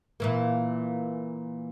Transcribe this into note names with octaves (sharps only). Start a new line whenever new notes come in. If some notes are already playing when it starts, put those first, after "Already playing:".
A#2 E3 A#3